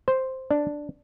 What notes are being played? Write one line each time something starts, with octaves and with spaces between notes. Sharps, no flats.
C5
D4